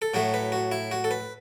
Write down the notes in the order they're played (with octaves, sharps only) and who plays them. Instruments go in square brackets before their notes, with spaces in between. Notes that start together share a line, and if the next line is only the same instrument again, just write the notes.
[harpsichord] A4
A2 F#3 A3 F#4
B4
F#4
E4
F#4
A4
B4